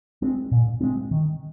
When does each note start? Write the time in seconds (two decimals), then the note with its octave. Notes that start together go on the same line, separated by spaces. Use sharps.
0.22 G#3 C4
0.51 A#2
0.81 G#3 C4
1.11 D#3